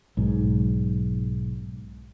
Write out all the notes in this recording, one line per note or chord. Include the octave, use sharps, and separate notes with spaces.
B1 G#2